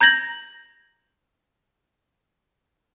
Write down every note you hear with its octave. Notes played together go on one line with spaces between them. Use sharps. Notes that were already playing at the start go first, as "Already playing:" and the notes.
A#5 G6 G#6 A#6 F#7